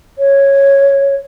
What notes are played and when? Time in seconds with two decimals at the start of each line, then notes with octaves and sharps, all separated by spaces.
0.19 C#5